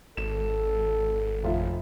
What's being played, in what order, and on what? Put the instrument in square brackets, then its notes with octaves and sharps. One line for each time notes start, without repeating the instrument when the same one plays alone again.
[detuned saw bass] G#1 [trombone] A4 [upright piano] E7
[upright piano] F1 F4 E5